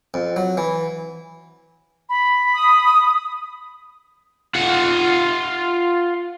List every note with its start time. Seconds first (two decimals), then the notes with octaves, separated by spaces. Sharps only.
0.14 F2
0.36 F#3
0.57 E3
2.09 B5
2.54 D#6
4.55 F4 F#5